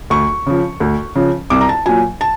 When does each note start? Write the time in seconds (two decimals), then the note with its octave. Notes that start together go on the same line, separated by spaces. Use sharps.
0.10 D2 C#6
0.46 C#3 F3
0.80 D2
1.16 C#3 F3
1.50 C2 D6
1.61 A#5
1.69 A5
1.86 A#2 F#3 G#5
2.21 A5